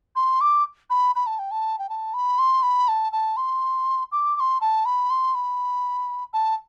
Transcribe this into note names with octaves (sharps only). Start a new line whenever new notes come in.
C6
D6
B5
B5
A5
G5
A5
G5
A5
B5
C6
B5
A5
A5
C6
D6
D6
C6
A5
B5
C6
B5
A5